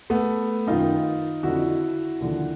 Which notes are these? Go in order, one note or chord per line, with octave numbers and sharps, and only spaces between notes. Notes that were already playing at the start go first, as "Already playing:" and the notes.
A3 B3
F#2 D#3 D#4 F4
F2 D3 F3 E4 F#4
D#2 D3 F3